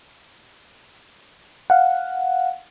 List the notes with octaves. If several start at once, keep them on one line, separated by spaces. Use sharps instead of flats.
F5 F#5